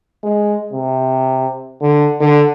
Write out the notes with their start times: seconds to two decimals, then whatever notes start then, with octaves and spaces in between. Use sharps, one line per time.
0.23 G#3
0.73 C3
1.82 D3
2.20 D3